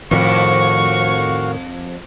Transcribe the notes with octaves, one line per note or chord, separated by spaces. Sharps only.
F2 A2 D#3 F#4 F5 C#6